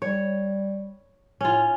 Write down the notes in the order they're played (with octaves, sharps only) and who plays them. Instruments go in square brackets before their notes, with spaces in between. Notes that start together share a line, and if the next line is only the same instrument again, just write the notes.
[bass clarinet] G3 [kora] C#5
[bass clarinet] A2 [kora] C#4 F4